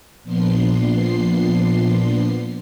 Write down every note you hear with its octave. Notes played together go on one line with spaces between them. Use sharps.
A#2 F3 B3 D4 C6 C7